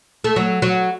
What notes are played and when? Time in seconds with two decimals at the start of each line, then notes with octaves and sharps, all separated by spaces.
0.24 A3
0.36 F#3
0.62 F#3